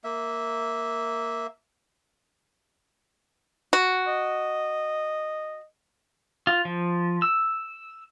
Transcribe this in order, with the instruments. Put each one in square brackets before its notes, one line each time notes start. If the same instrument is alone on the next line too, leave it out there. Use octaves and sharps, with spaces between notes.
[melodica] A#3 E5
[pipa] F#4
[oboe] D#5
[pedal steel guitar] F4
F3
E6